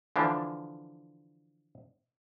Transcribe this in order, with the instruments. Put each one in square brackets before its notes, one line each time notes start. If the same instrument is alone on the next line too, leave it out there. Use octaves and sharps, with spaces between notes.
[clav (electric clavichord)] D3 E3 F3 D4